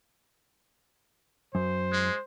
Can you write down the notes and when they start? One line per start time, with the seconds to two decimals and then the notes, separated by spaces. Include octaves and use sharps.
1.55 F#2 C5
1.92 G#3